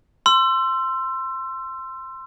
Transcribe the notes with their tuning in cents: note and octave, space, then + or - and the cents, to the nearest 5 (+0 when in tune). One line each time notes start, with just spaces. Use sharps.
C6 +0 E6 +30